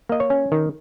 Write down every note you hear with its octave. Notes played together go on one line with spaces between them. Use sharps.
A#3 D#5
C#5
C#4
D#3